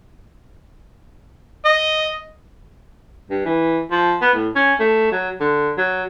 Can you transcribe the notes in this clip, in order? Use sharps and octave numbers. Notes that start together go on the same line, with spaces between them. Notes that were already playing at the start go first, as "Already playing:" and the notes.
D#5
G2
E3
F3
B3
A2
C#4
A3
F#3
D3
F#3